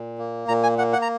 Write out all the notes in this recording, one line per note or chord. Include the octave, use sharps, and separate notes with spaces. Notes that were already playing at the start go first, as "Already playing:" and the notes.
Already playing: A#2
A#3
A#2 A#5
G#5
A#3 F#5
F#5
A#5